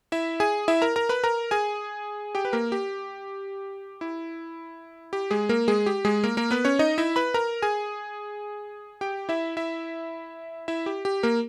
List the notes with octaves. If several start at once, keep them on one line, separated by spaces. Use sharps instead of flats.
E4 E5
G#4 G#5
E4 E5
A#4 A#5
A#4 A#5
B4 B5
A#4 A#5
G#4 G#5
G4 G5
B4
A#3 A#4
G4
E4
G4
G#3 G#4
A#3 A#4
G#3 G#4
G4
G#3 G#4
A#3 A#4
A#3 A#4
B3 B4
C#4 C#5
D#4 D#5
E4 E5
B4 B5
A#4 A#5
G#4 G#5
G4 G5
E4 E5
E4 E5
E4 E5
G4
G4
A#3 A#4